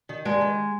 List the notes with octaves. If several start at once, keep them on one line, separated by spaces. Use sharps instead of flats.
D#3
G2 G#3
D#3